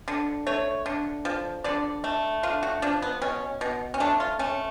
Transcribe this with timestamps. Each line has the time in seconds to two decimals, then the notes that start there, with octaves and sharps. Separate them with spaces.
0.08 D3
0.47 A3 C#5
0.86 D3
1.25 F3
1.64 D3 D5
2.04 A3
2.43 D3 F4
2.63 F#4
2.82 F3 D4
3.02 B3
3.22 B2 C#4
3.61 B2
3.94 C#4
4.00 A3 D4
4.20 F4
4.39 A3 C#4